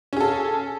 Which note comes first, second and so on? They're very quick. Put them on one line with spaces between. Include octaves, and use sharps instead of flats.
C#4 G#4 A4